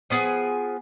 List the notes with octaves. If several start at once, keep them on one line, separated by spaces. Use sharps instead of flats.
F3 B3 G#4 G#5